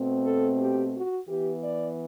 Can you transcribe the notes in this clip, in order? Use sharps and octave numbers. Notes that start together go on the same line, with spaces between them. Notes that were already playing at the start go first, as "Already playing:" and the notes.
Already playing: B2 A3 C4
A4
G4
F#4
E3 B3 G4
D5